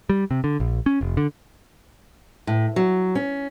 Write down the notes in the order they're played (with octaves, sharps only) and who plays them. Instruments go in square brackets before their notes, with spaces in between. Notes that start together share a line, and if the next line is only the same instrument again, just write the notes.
[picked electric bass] G3
C3
D3
A#1
C#4
F1
D3
[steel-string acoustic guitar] A2
F#3
C#4